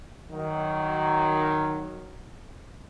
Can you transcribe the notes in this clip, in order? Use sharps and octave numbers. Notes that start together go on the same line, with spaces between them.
D#3 F#3